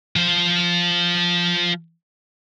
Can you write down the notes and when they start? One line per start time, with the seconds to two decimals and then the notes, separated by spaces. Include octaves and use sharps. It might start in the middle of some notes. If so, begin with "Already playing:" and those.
0.16 F3 C5